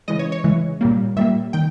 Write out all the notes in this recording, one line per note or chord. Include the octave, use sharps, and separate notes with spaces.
C#3 E3 G#3 D#5
C#5
C#5
C#3 E3 G#3
A#2 G3 A#3
A#2 G3 A#3 E5
D#3 G5